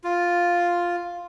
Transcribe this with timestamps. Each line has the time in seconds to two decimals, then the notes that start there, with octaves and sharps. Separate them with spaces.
0.04 F4